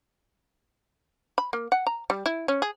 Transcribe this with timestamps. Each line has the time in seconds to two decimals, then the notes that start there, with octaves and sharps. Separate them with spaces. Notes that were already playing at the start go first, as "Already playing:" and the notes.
1.38 B5
1.53 A#3
1.72 F#5
1.87 A#5
2.10 G3
2.26 E4
2.48 C#4
2.62 G#4